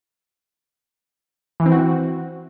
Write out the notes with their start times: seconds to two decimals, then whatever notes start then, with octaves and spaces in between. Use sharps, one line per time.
1.60 E3
1.66 C4
1.72 F#4